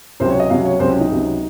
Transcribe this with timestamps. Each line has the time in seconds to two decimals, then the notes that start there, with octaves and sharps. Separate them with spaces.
0.20 C#2 C3 F#3 C5
0.30 C#5
0.40 D#5
0.50 C#2 C3 F#3 F5
0.66 C#5
0.79 C#2 C3 F#3 C5
0.90 C#4
1.00 D#4
1.10 C#2 C3 F#3